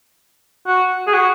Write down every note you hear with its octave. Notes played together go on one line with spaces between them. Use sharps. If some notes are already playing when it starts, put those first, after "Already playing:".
F#4
G#4
F#4